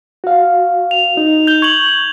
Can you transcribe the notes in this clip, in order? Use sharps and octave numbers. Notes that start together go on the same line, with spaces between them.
F#4 F5
F7
D#4
G6 G7
C#6 G#6 F#7